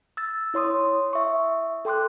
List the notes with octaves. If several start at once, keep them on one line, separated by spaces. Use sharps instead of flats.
E6 A6
E4 C#5 C6 D#6
E5 C#6
A4 G5 C6 D6 F#6